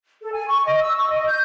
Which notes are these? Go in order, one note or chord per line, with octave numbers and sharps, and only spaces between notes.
A4
G#5
C#6
D#5
E6
C#6
D#5
G6